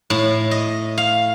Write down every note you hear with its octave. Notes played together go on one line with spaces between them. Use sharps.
A2
D#5
F5